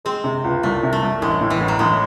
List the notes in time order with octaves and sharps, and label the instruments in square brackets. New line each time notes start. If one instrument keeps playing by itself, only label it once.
[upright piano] G#3 [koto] C4
[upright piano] C3
C#2
[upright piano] C2 [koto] A3
[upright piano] C3
[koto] A3
[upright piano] C2
[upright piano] A1 [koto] G#3
[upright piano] A2
[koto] E3
[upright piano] A1
[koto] F#3
[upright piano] A1 [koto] G#3